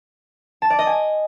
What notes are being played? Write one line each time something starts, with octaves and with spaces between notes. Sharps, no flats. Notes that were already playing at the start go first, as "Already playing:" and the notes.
A5
D5
D#5
G#5